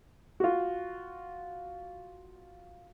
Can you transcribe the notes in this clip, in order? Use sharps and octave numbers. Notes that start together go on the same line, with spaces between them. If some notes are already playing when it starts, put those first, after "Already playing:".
F4 F#4